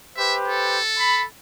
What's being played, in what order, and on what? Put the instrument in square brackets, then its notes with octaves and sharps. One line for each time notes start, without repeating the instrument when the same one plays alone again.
[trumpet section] G4 B4 C5 [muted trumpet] E5
[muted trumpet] A4
[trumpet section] B5